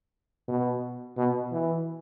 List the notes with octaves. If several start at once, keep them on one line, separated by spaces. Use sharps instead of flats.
B2
B2
E3